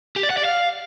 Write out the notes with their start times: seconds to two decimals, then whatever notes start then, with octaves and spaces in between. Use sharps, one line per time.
0.16 G4
0.23 D5
0.30 F#5
0.37 D5
0.45 F5